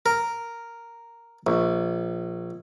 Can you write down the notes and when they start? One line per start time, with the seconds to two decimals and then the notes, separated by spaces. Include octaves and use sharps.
0.06 A#4
1.47 A#1